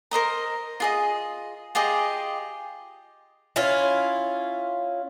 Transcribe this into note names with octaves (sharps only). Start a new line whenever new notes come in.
A#4 C5 D#5 A#5
F4 G#4 D#5
F4 G4 G#4 D#5
C#4 E4 F4